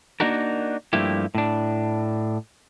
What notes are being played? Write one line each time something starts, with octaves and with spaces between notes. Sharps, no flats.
A#3 D4 D#4 F#4 A#4
G2 F3 A3 A#3 E4 G4
A2 D4